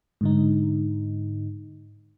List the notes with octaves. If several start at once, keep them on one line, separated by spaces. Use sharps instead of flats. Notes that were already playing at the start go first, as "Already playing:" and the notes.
G#2 D3 D#4